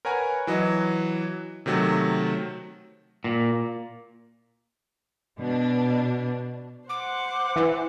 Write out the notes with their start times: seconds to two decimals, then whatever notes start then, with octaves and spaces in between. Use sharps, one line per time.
0.05 A#4 B4 C#5 F#5 G#5 A#5
0.47 E3 F#3 D#5
1.66 C3 D#3 F#3 A3
3.24 A#2
5.40 B2 D4
6.90 C5 F#5 D6
7.56 E3